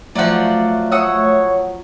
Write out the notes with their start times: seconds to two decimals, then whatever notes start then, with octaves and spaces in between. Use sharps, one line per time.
0.15 F3 F#3 A3 D5 F#5
0.92 C#5 F#5 D#6 E6